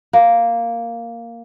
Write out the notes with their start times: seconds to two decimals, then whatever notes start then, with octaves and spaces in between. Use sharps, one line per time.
0.13 A#3